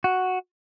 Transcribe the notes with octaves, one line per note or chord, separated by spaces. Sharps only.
F#4